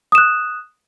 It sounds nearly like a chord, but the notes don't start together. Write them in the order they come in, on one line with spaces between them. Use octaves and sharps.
D#6 E7 F#6